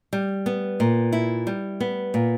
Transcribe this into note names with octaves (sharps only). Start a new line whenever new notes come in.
G3
B3
A#2
E4
G3
B3
A#2